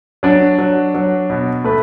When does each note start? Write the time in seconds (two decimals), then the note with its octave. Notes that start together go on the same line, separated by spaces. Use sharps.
0.23 F#3 D4 D5
0.58 F#3
0.94 F#3
1.30 B2
1.64 A3 B4